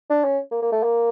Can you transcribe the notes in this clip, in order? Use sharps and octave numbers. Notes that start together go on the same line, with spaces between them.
D4
C#4
A#3
A#3
A3
A#3